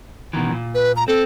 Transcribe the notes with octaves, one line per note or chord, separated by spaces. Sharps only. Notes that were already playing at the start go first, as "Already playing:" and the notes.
B2 D#3 E3
A#2
B4
A#5
C4 A4